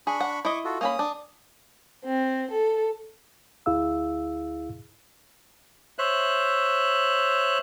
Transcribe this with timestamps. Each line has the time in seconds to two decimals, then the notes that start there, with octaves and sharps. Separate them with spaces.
0.07 D4 G#4 B5 C#6
0.21 F#5
0.45 E4 D#5 C#6 D6
0.65 F4 F#4 A4
0.81 A#3 C#4 B5 D#6
0.99 D4
2.04 C4
2.52 A4
3.66 D2 E4 G#4 F5 E6
5.99 C5 C#5 E5 F#6